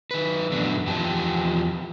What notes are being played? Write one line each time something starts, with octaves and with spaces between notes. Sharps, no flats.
D#3 B4
F#2 A#2 A3 B3 D4
E2 F3 G4 G5 A5